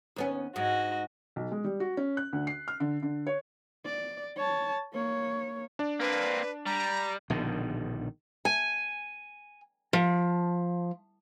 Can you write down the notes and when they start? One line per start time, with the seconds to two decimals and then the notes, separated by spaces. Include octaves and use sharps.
0.16 D#2 B3 C#4
0.56 G#2 F#4 D#5
1.36 B1
1.52 G#3
1.64 G3
1.80 F#4
1.97 C#4
2.17 F#6
2.33 D2
2.47 C7
2.68 F6
2.80 D3
3.03 D3
3.27 C#5
3.86 D5
4.37 C#5 A5
4.93 A#3 C#5
5.79 D4 D5
6.00 A#3 C4 B4
6.66 G3 A#5
7.30 A#1 B2 D3 D#3
8.45 G#5
9.93 F3